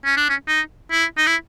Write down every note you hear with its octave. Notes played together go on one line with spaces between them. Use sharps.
C#4
D4
C#4
D#4
E4
D#4
E4